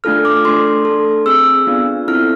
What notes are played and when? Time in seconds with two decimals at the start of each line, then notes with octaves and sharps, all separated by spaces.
0.04 A3 D4 F4 A4 F6
0.25 D6
0.45 A3 D4 A4 C6
0.85 D4 A4
1.26 C4 G#4 E6
1.67 B3 D4 F4
2.08 C4 E4 A4 F6